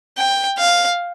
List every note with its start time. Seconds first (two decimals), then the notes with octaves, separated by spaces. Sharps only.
0.18 G5
0.59 F5